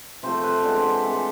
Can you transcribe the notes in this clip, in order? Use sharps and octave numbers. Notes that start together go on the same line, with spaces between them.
C3 F3 A3 C5
B4
E3 G#3 B3 D4 C5
C5
B4
E3 A3 C4 A4
C5